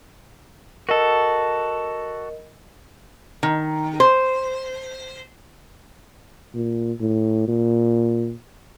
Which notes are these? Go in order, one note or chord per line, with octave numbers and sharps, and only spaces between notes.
F#4 A4 A#4 D#5
D#3
C5
A#2
A2
A#2